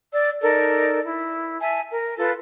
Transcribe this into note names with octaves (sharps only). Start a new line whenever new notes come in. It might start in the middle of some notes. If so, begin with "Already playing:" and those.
D5 E6
D#4 A4 A#4 D5
E4
E5 G#5 A5
A#4
F4 A4 B4